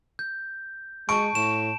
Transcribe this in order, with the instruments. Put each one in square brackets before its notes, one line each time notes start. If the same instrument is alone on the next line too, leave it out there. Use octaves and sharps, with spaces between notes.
[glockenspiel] G6
[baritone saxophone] G#3 [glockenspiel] A5 D7 [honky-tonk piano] C#6
[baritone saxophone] A2 [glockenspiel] E7